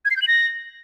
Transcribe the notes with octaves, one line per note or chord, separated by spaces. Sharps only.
G#6
C7
G6
F#7
A#6